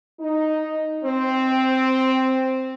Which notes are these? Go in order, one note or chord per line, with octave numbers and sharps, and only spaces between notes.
D#4
C4